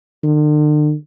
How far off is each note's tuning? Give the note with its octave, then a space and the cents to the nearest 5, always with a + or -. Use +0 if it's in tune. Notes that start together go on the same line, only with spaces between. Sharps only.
D3 +45